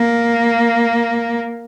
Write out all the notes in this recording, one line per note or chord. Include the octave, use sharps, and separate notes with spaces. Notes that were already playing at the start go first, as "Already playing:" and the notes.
Already playing: A#3